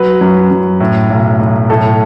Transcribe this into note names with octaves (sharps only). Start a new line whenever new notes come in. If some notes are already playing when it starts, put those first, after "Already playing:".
Already playing: F#3 B4
F#2
F#2
A2
B1
B1
A2 A4